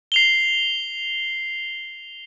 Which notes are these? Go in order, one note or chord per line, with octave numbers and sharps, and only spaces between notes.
C7 F7 G7